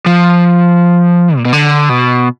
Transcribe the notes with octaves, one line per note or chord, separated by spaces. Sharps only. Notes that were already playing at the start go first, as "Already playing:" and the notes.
F3
A#2
B2
D3
B2